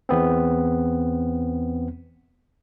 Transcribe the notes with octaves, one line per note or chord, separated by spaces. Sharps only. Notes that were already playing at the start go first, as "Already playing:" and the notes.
E2 B3 C4